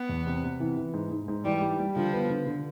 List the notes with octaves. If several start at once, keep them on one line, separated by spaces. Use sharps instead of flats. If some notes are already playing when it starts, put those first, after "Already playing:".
Already playing: B3
E2
C3
C3
E3
E3
G#2
G#2
G#2
E3 G3
G3
G3
D3 F3
B3
D3
D3